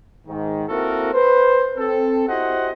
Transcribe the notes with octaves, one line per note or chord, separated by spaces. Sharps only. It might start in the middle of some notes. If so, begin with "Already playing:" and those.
G#2 D#3
A#3 C4 E4 F#4 A4 A#4
B4 C5
C4 A4
E4 F#4 G4 C5 D#5 F#5